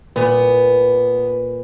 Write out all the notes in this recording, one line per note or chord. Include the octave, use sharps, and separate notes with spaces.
A#2 B3